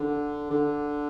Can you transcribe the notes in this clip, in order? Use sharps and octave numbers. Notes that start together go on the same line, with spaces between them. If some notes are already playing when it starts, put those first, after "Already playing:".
Already playing: D3
D3